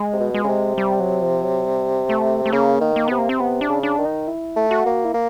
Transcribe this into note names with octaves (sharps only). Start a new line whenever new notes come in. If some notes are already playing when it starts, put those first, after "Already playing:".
Already playing: G#3
C3
B2
G#3
C#3
C3
G3
F#3
F3
F#3
G3
A3
A3
C#3 A#3
D#3
A#3
C3 B3
A#3
C4
C3 B3
D4
C#3
D4
D#3
D#4
E4
A3
F#4
A#3
E4
A#3